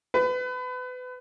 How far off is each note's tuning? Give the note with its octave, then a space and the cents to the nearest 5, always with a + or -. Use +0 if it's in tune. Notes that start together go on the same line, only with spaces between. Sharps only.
B4 +30